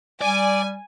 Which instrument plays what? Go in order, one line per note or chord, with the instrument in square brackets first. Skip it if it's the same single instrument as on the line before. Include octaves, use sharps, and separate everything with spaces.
[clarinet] G3 [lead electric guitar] D5 [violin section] G#5